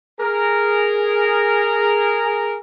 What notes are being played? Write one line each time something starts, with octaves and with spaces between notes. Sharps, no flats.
G#4 A#4